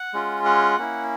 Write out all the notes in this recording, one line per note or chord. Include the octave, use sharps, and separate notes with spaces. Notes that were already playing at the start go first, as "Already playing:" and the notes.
Already playing: F#5
G#3 C#4 F4
F#5
A#3 C#4 E4